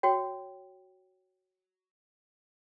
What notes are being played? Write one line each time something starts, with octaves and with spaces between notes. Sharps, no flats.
F#4 C#5 G5